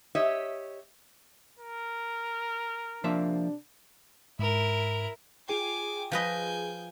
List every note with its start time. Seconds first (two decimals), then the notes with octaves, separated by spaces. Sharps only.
0.15 G4 C#5 D#5 E5
1.59 A#4
3.04 C3 F3 A#3 D4 E5
4.39 G#2 E4 A#4
5.48 F4 G#4 G5 G#5 D6
6.12 F3 B4 D#5 G#5 G6